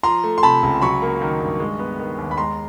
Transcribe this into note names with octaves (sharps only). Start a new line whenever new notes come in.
F3 A#5 C6
A3
C6
C3 A5 B5
C#2
F#3 B5 C#6
A#3
D#3
G2
G#3
B3
D#3
D#2
B5
G#3 A#5 C6